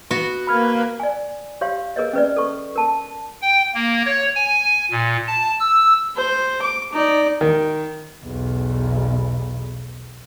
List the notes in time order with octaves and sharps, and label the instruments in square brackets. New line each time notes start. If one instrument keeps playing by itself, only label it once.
[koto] B3 F#4
[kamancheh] A#3 B4 [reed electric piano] B5 F6 G#6
[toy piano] D5 G#5
G4 C#5 F5 C6
G#4 A#4 B4 C#5 D#5
C#4 B4 D5
A4 B4 C#6
A#4 A5
[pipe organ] G5
A#3
C#5
G#5
A#2
A5
E6
[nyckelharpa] C5
D6
D#4 D5
[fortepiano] D#3
[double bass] B1 E2